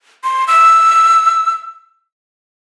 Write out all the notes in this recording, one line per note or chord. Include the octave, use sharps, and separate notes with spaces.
C6
E6